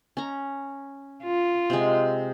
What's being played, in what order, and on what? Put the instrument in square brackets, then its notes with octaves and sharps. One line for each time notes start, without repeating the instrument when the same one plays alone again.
[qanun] C#4 A#5
[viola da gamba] F4
[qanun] C3 G#3